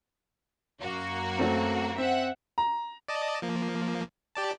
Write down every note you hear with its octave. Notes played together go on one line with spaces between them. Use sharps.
F#2 A#3 F#4
F#3 A3 C4
C4 E5 F#5
A#5
D5 D#5 A5
F3 A#3
G4 D5 A5